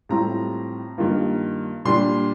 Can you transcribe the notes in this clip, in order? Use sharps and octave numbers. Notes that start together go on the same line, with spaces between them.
A2 G3 C4 F4 A#5
G2 D#3 A#3 F4
A#2 G3 D4 C6